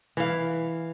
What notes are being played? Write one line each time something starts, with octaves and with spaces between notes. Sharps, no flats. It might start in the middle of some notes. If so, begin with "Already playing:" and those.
E3 F5